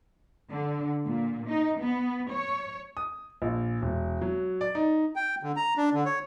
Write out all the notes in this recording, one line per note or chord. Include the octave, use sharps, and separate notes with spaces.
D3
A#2
D#4
B3
C#5
D#6
A#1
E1
F#3
D5
D#4
G5
D3
A#5
D4
D3
C#5